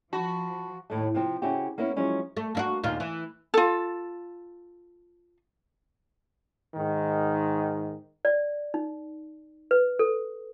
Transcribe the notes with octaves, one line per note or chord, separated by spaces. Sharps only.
F3 F#4 A5 B5
D#2 A2 A3
C3 F3 C4
C#3 C4 C#4 E4 F#4 G4
A#3 B3 C#4 E4 A#4
F3 F#3 G#3 C#4 E4
A3
A#3 E4 F#4
D#2 A#2 F4
E3
F4 A4
G#2 D#3
D5
D#4
B4
A4